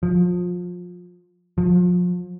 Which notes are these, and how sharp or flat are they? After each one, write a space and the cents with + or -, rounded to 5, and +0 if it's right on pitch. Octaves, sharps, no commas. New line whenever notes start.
F3 +25
F3 +35